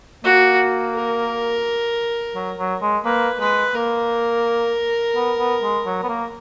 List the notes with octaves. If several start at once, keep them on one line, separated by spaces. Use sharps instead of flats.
A#3 F#4
A#4
F#3
F#3
G#3
A#3 B4
G#3 B4
A#3 A#4
B3
B3
G#3
F#3
B3
A#3